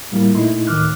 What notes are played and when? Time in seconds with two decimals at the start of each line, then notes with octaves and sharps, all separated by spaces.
0.12 A2 G3 A#3 E4 F4
0.35 A#2 A3 D#4 E4 C6
0.67 D2 A2 D#3 D6 F6 F#6